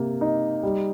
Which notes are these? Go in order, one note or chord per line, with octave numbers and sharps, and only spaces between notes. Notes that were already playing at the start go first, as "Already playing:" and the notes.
Already playing: C3 A#3
D#4
G3